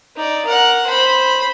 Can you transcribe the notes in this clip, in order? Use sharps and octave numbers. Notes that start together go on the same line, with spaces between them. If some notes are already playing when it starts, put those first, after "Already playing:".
D#4 D5
A#4 F#5
C5 B5